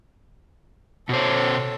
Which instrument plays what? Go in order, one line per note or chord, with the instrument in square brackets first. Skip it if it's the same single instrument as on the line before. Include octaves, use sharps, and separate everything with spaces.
[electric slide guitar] B2 C5 [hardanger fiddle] A4 C#5